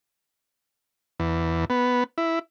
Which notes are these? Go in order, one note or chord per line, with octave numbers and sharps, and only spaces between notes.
E2
B3
E4